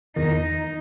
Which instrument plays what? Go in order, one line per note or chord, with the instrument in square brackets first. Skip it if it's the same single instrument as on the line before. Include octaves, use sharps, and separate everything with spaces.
[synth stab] E2 D#3 [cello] D#4